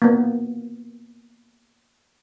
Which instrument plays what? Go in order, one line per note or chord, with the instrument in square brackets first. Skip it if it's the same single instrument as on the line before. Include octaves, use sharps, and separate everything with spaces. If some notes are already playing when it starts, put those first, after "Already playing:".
[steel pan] A#3 B3